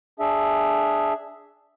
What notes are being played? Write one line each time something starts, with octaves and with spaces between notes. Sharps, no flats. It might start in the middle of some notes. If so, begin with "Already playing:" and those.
D4 G#4 E5